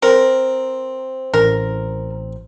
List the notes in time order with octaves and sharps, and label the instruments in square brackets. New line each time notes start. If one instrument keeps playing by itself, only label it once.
[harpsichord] C4 [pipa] A#4
[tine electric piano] A1 [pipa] A#4